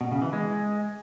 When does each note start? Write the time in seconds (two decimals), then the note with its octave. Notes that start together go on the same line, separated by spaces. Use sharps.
0.01 B2
0.12 C#3
0.22 E3
0.33 G#3